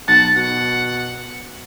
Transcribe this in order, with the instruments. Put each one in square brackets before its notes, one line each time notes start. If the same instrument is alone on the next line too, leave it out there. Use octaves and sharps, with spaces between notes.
[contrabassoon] B1 [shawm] F#5 [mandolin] A5
[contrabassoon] B2 [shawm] F#5